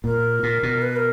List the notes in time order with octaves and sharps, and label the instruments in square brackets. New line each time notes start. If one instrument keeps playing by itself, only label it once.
[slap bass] A#2 [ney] A#4
[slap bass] A#2
B2
[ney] B4
A#4